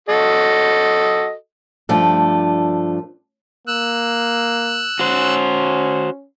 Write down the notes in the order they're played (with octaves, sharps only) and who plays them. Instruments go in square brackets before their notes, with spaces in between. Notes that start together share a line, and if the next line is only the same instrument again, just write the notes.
[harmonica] F#4 A4 D#5
[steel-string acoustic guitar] G2 F3 A3 D4 A4
[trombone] A#3 [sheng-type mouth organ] E6 F#6
[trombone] C#4 [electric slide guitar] F#4 C5